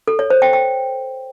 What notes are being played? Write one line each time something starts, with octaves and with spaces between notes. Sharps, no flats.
A4
C#5
C5
G5
G5